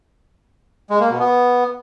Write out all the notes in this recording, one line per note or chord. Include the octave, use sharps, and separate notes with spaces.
G#3
A#3
B2
B3